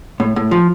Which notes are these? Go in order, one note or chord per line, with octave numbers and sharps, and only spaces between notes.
A2
A2
F3